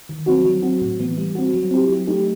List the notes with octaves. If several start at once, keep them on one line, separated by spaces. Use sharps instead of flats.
D#3
F#3 C4 D#4 F#4
F#3
C4 F#4
A2
E3 B3
G3
C4 F#4
F#3
C4 E4 G4
F#3
A3 D#4 G4